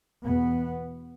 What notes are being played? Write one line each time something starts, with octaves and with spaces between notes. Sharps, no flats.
E2 B2 B3